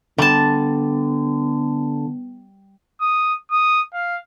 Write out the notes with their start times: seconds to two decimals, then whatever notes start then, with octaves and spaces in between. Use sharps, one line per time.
0.18 D3 G3 B3 A5
3.01 D#6
3.50 D#6
3.94 F5